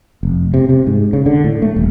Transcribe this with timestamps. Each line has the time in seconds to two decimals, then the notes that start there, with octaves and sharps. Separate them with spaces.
0.23 F1
0.54 C3
0.69 C3
0.87 G#2
1.13 C#3
1.26 D3
1.44 A2
1.62 A3
1.76 D#1